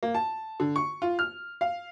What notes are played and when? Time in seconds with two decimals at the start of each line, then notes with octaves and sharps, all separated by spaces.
0.03 A#3
0.14 A5
0.60 D3
0.76 C#6
1.02 F4
1.19 F6
1.61 F5